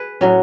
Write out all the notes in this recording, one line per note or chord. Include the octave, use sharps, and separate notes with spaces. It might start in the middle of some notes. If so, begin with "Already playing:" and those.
Already playing: G#4 B4
A2 F#3 C#4